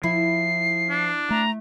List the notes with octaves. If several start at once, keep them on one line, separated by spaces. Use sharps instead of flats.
F3 E4 C7
D4
A3 A#5